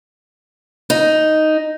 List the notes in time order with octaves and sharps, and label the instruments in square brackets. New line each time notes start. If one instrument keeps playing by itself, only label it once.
[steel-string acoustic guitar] D#4